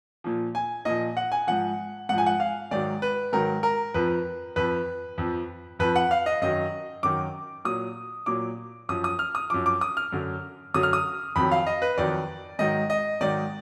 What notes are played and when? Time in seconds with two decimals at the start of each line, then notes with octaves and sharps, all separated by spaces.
0.24 A#2 F3
0.55 G#5
0.85 A#2 F3 D#5
1.17 F#5
1.32 G#5
1.47 G#2 F3 F#5
2.09 G#2 F#5
2.14 F3 G#5
2.26 F#5
2.40 F5
2.71 G#2 D#3 F#3 D5
3.02 B4
3.33 G#2 D#3 F#3 A#4
3.63 A#4
3.94 F2 F3 B4
4.56 F2 F3 B4
5.18 F2 F3
5.79 F2 F3 B4
5.96 F#5
6.11 F5
6.26 D#5
6.42 F#2 D#3 F#3 D#5
7.03 F#2 D#3 F#3 D6
7.65 A#2 F#3 D#6
8.26 A#2 F#3 D6
8.89 F#2 F3 D#6
9.04 D#6
9.19 F6
9.35 D#6
9.50 F#2 F3 D6
9.66 D6
9.81 D#6
9.97 F6
10.12 F#2 D3 F#3
10.74 F#2 D3 F#3 D#6
10.83 F6
10.93 D#6
11.36 F2 D#3 F#3 B5
11.51 F5
11.67 D#5
11.82 B4
11.98 F2 D#3 F#3 D5
12.59 G#2 D#3 F#3 D#5
12.90 D#5
13.21 G#2 D#3 F#3 D5